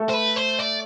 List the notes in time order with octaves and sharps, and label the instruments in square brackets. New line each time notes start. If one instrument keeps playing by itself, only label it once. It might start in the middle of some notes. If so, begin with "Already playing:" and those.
Already playing: [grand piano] A3 A4
[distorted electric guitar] C5
B4
C5
D5